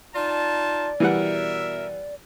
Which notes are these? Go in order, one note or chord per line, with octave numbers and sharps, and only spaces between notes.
D#4 F4 D5 A5
B2 E3 G3 A#4 E5 F#5